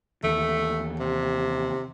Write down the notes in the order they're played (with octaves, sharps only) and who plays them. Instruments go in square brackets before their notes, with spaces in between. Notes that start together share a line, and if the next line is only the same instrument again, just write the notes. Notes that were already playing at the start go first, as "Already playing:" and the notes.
[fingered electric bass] D#2 E3 [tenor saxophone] A3
[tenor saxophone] C3